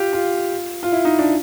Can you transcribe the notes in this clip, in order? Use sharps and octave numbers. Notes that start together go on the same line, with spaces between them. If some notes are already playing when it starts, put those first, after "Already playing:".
Already playing: F4 G4
F4
F4
E4
D#4
D4